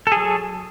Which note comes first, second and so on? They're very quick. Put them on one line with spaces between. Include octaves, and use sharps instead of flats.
A4 G#4 F#3